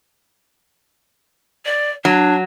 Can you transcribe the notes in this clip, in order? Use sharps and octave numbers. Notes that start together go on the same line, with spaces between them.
D5
F#3 D4